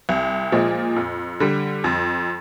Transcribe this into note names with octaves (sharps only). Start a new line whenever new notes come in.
C2
A#2 F3 G#3
F2
D3 G3
F2